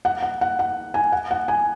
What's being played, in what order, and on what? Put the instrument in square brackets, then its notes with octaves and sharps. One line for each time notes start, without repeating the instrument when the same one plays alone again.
[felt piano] F#5
F#5
F#5
F#5
G#5
F#5
F#5
G#5